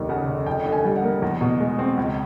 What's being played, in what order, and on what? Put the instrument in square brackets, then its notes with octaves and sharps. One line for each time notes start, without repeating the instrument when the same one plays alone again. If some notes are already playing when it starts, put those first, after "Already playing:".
Already playing: [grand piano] F1 D#2
C#3 F#5
F1
F2 G5
D3
G#5
G3
F#5
A#3
E2
B2
G#3
C4
C#2